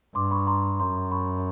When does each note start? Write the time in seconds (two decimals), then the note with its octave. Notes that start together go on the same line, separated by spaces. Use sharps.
0.15 G2 C6 D6
0.31 B5 C#6
0.47 A#5 C6
0.80 F#2 A#5 C6
1.11 B5 C#6